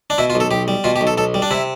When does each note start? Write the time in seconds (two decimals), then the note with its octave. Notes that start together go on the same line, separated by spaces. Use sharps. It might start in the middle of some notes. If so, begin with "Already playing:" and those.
0.10 D4
0.18 B2 E4
0.30 F4
0.35 B1
0.40 A4
0.51 B1 G4
0.68 G3
0.84 B2 F4
0.96 G4
1.01 B1
1.07 A4
1.18 B1 A4
1.34 G3
1.42 D4
1.51 C3 E4